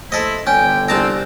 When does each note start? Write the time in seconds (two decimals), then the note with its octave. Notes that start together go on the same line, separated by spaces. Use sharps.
0.12 A3 E4 A4 C5 D#5
0.47 G1 D3 C#4 G5 G#5
0.89 C2 C4 A5 A#5